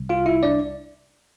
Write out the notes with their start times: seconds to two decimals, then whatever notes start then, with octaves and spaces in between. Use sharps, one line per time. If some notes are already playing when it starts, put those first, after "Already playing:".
Already playing: C2 C3 G3
0.09 F4 F5
0.26 E4 E5
0.43 D4 D5